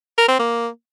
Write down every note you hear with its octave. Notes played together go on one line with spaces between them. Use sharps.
A#4
C4
A#3